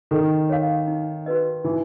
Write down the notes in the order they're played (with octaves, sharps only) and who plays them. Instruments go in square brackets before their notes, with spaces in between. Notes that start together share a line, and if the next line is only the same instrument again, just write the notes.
[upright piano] D#3 [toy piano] A4
[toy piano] C#5 F5
D#4
F#4 B4 D#5
[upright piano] E3 [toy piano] D#4